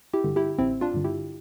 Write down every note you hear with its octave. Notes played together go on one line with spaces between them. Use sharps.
E4 G4
G2 D3
E4 G4
A1 C4 E4
D4 F4
G2 D3
E4 G4